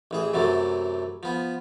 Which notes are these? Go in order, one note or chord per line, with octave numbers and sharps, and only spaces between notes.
A1 E3 G#4
F#2 C3 E3 F#3 A3
F3 B3